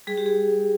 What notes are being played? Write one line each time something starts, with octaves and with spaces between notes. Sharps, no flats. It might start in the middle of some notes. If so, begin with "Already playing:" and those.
G3 G#4
G4
G#4